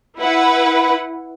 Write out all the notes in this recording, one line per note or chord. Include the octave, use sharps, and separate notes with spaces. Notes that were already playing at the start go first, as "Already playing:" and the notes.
E4 B4 F#5